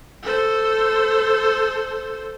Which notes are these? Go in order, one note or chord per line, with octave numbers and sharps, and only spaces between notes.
A4 C5